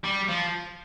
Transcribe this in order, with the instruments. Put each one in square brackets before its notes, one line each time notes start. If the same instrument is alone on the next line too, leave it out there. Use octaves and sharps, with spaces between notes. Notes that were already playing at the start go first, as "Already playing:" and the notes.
[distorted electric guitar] G3
F3